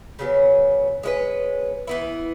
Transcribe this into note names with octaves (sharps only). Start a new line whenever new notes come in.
C#3 F#3 B3
G#3 C#4 E4 B4
E3 B3 E4